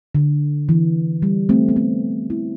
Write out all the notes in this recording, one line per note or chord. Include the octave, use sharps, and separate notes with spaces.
D3
E3
G3
A3 C4
B3
A3 C4
C4 E4